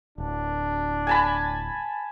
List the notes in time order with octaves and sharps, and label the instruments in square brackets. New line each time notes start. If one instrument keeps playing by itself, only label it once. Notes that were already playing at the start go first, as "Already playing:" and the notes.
[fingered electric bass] D1 [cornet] D4
[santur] G#5 A5 B5